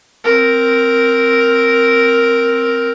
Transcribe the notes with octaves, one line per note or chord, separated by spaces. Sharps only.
C4 A#4